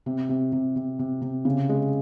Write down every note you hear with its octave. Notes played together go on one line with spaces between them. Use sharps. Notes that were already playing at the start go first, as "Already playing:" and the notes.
C3
C3
C3
C3
C3
C3
C#3
G#3